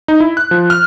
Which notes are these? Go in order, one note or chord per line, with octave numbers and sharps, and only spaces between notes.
D#4
E4
F#6
F3
F6